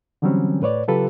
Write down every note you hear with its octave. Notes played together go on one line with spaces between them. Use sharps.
D3 E3 F#3 G3 C4 C#4
A2 B4 C#5 D5
C#3 F#3 F4 G4 A4 B4